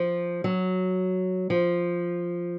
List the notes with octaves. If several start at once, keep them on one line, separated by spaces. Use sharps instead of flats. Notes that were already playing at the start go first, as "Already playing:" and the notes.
Already playing: F3
F#3
F3